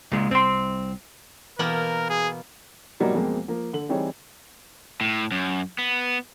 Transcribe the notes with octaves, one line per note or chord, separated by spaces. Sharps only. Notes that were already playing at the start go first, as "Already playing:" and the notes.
C#2 A#2 C#3 G#3
C2 C4 C6
B2 E3 A#3 B3 A#4
G#4
G#2 B2 F#3 G3 A#3 D#4
F2 B2 G#3 A#3 C4
F3 A#3
D3 F#7
E3 G3 C4 D#4 G#4 C#5
A2
F#2
B3